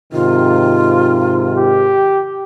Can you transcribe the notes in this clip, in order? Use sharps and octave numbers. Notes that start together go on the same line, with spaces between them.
G#2 C3 D#3 F4
G4